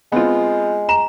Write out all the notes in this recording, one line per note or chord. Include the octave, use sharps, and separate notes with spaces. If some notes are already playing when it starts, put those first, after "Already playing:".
G#3 B3 C4 F4
A#5 E7